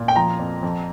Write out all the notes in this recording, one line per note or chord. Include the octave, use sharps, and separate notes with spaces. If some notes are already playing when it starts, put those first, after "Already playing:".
Already playing: A#2
G5
F3 A#5
F2
F2